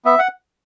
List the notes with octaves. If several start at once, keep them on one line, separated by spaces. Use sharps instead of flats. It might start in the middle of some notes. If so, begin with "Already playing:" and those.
B3 E5
F#5